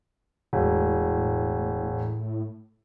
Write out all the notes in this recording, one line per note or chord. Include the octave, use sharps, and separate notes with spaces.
E1 A2